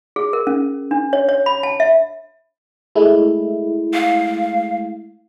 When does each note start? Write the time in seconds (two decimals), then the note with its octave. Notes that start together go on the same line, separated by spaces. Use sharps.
0.16 G#4
0.33 A#4
0.47 C#4
0.91 D4
1.13 C#5
1.29 C#5
1.46 B5
1.63 A5
1.80 E5
2.95 G#3 A3 E4
3.94 F5